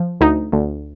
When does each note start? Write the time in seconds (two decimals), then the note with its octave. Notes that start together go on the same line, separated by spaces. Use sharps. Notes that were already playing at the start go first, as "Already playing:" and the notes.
Already playing: F3
0.21 D2 D#4
0.52 D2